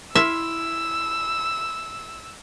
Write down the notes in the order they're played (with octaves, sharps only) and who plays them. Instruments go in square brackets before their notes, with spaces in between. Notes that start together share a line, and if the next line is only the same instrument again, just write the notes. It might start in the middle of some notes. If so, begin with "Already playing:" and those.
[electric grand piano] E4 C6 F6 [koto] E5 [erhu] E6